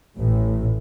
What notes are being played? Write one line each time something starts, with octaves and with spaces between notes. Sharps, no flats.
A1 A2